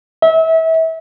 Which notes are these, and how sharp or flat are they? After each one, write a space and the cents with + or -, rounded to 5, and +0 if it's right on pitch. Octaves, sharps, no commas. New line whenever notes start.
E5 -30